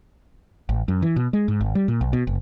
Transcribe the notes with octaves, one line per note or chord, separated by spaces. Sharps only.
A1
F#2
E3
B2
G#3
G#2
G#1
G3
A#2
B1
B2
F#1